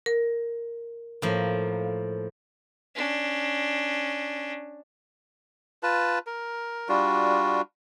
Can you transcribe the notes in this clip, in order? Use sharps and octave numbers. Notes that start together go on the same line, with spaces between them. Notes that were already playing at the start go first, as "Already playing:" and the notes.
A#4
A2 F3 A#3
C#4 D4
F4 B4 A5
A#4
G3 D4 F4 F#4